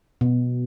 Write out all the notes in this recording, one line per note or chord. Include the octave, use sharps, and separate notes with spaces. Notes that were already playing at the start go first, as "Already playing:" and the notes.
B2